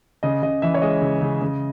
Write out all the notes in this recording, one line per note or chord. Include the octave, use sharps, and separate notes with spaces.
C#3 D#5
C#3 D#5
E3 E5
C#5
G#3 D#5
C#3
C#3
C#3